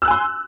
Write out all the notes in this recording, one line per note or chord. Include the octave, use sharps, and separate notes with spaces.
G#5 C6 E6 F#6